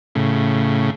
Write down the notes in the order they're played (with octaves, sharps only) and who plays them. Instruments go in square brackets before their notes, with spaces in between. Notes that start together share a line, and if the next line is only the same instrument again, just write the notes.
[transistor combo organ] A2 C#3